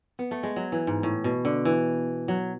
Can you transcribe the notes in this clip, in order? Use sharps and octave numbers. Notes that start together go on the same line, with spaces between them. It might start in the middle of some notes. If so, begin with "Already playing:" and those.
B3
A3
G#3
F#3
E3
G#2
A2
B2
D3
E3
F#3